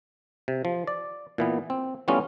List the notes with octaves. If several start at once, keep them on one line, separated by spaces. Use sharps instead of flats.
C3
F3
D5
A#2 E3 B3
C4
E3 G3 A3 B3 C#4 F4